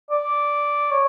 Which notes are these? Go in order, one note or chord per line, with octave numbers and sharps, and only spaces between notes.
D5
C#5